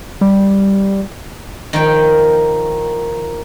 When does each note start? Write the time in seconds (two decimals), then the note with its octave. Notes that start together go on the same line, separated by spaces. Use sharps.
0.21 G3
1.73 D#3 F3 G5